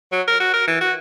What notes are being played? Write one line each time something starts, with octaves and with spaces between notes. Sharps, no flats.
F#3
A#4
F#4
A#4
E3
F#4